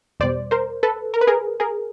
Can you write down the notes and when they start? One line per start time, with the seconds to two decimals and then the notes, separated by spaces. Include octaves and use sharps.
0.20 E2 B2 G3 C5 D5
0.51 A#4 C5
0.83 A4 B4
1.14 A#4
1.21 B4
1.27 G#4 A#4
1.60 G#4 A#4